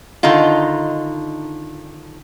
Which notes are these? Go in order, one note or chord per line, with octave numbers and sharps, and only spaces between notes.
D3 D#3 D#4 F4